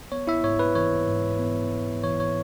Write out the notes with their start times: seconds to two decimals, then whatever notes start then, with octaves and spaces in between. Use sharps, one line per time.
0.12 B3 C#5
0.27 E4 E5
0.44 G#2 C#5
0.59 B4
0.75 E3 C#5
1.07 G#2
1.39 B3
1.72 G#2
2.04 E3 C#5
2.20 C#5